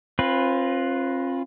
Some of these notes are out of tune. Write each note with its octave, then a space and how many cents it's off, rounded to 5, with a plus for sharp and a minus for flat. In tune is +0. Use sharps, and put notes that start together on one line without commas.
C4 +40 F4 +0 B4 +0